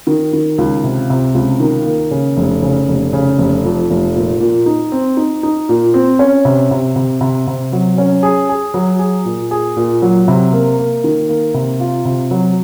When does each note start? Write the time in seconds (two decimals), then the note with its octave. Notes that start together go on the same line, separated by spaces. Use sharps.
0.07 D#3
0.33 D#3
0.58 C#2
0.84 C3
1.10 C3
1.34 C#2
1.60 D#3
1.86 A#3
2.11 C#3
2.37 F1
2.63 C#3
2.88 F1
3.13 C#3
3.38 F1
3.65 F2
3.90 F1
4.16 A#2
4.40 A#2
4.66 D#4
4.92 C4
5.17 D#4
5.43 D#4
5.69 A#2
5.94 C4
6.19 C#4
6.45 C3
6.71 C3
6.96 C3
7.21 C3
7.47 C3
7.73 F#3
7.98 C#4
8.23 G#4
8.49 G#4
8.74 F#3
8.99 G#4
9.25 A#2
9.51 G#4
9.76 A#2
10.02 F#3
10.28 C3
10.53 A#3
10.79 A#3
11.04 D#3
11.29 A#3
11.54 C3
11.80 F4
12.05 C3
12.31 F#3